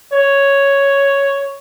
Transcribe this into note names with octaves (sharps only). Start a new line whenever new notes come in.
C#5